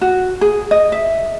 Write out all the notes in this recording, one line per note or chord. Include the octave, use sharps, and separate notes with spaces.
F#4
G#4
D#5
E5